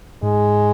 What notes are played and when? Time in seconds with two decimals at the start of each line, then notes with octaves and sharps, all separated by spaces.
0.22 G#2 G#3